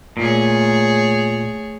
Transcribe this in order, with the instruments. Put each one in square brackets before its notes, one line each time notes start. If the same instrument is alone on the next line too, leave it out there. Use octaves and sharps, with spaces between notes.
[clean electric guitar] A#2 [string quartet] A3 G#4 C#5